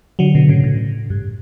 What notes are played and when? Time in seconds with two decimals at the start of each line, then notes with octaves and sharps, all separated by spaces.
0.19 D3 F#3
0.35 B2 D3
0.49 A2 C#3
0.64 A2
1.10 G2